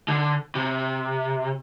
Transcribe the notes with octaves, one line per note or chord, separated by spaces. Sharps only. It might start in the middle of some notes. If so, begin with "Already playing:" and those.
D3
C3